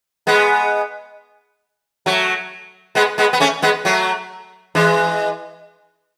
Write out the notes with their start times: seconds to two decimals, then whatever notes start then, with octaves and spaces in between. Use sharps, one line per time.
0.27 G#3 B3
2.06 F#3 A3
2.95 G#3 B3
3.18 G#3 B3
3.33 B3
3.40 A3 C#4
3.62 G#3 B3
3.85 F#3 A3
4.75 E3 G#3